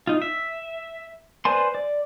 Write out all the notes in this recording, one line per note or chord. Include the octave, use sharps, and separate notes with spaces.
D#4 F4
E5
B4 C5 D5 G#5 C6
D5